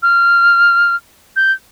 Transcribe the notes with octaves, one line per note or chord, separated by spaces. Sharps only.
F6
G6